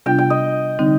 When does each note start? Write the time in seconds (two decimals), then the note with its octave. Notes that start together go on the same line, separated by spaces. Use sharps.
0.06 C3 G3 B3 D4 F4 G5
0.18 G5
0.30 D#5
0.79 D3 G3 C4 D#4